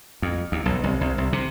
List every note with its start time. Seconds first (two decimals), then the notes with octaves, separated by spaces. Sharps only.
0.22 F2
0.52 D#2
0.66 B1
0.84 C2
1.01 C2
1.18 C2
1.33 C3